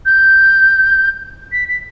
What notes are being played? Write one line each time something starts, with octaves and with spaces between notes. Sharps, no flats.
G6
B6
B6